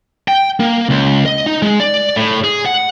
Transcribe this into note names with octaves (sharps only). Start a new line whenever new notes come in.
G5
A#3
C#2
D#5
D#4
G#3
D5
A2
G#4
F#5